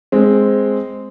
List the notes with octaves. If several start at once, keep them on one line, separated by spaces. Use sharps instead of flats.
G#3 C4